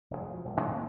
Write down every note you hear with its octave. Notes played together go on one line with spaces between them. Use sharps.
F1 E2 G#2 G#3
B2 F3
D#1 B1 A2 G#3
G#2 C#3 F#3 B3
F#3 A#3 C4 C#4